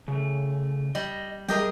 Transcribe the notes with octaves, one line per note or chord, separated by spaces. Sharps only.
C#3 A3
G3 D#5
G3 G4 G#4 A#4 D#5 G5